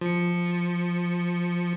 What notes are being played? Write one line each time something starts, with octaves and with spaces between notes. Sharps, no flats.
F3 C#7